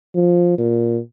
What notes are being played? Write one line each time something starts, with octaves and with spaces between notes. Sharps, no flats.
F3
A#2